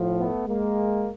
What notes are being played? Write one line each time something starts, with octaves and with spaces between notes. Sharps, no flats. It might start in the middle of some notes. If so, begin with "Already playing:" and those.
Already playing: A2 F3
A3 B3
G#3 A#3